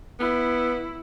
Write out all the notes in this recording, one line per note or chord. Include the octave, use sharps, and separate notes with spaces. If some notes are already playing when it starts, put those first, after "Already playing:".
B3 E4